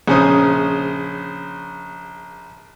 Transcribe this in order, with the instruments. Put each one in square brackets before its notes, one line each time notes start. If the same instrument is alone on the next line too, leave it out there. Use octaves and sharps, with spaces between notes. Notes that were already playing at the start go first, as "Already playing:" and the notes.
[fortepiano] A#1 C#3 C#4 C5 D#6